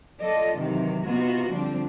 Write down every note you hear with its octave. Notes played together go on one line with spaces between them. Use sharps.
F4 A4 D5 D#5
G#2 C3 D#3 E3 F#3
C3 B3 D#4 F4 F#4
D3 F3 G3 C4 D4